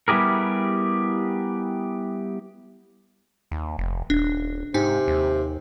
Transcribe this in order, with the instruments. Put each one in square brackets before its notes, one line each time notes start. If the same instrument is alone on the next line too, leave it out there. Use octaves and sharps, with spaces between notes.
[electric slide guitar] G3 B3 E4 G4 G#4 A#4
[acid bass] D#2
F1
[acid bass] D#1 [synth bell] D4
[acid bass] G#2 [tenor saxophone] C3 [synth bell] D#4 G5 G#5
[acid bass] D#2